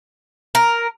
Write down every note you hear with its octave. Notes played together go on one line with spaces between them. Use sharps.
A#4